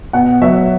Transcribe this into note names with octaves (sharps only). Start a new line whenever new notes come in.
B2 F#5
F#3 E5